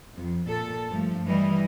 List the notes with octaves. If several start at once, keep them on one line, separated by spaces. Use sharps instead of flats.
F2
A#2 A4
G2 F3 A3
E3 G3 D#5